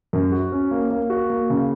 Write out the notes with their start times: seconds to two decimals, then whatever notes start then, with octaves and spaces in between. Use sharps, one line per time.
0.13 F#2
0.32 F#4
0.52 C#4
0.71 A#3
0.90 A#3
1.10 F#4
1.30 A#3
1.50 C#3